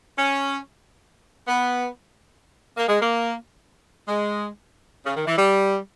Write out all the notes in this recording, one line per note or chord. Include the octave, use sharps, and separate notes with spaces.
C#4
B3
A#3
G#3
A#3
G#3
C#3
D#3
E3
G3